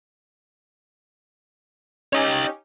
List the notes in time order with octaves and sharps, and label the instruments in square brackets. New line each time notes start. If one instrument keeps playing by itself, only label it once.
[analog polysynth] C#4 D#4 G4 [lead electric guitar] C#5 D#5